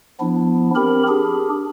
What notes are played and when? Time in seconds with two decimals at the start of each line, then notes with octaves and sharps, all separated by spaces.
0.20 F3 B3 D4 E4
0.76 C4 G4 A#4 B5
1.08 D4 G4 G#4